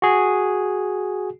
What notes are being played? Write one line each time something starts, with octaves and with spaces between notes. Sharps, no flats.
F#4 G#4